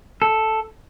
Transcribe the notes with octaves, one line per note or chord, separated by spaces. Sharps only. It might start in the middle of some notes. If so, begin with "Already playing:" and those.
A4